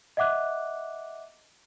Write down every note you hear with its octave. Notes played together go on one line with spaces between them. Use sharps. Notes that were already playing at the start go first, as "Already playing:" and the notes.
D#5 E5 F#5 D6 F#6